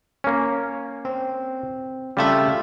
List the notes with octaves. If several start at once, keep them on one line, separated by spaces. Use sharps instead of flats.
A#3 C#4
C4
C#3 G3 A3 F4 E5